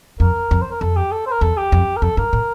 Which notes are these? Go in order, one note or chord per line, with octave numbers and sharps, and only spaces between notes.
F2 A#4
F2
C5
A#4
F2 A4
G4
A4
C5
A#4
E2 A4
G4
F2
A#4
F2 A4
G2 A#4
A2